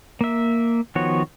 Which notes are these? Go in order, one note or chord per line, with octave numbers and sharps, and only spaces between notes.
A#3 E5
D#3 F3 B3 F#4 C#5